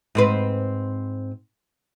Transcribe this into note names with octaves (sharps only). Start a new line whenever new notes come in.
G#2 C4 B4